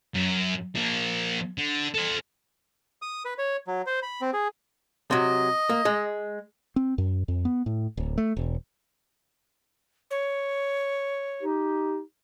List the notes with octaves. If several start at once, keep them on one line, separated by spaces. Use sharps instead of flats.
F#2
F3 A#3
D3
A4 C5
D#6
B4
C#5
F#3
C5
B5
C4
G#4
C3 F#3 D#5
A#3
G#3
C4
F#2
F2
B3
A2
D1
A3
E1
C#5
D#4 G4